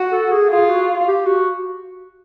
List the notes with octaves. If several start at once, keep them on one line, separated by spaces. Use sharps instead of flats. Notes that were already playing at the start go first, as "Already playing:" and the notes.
Already playing: F#4
A4
G#4
F4 G#4
F#4
G4
F#4